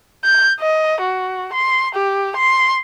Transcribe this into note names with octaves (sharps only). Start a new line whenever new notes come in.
G6
D#5
F#4
C6
G4
C6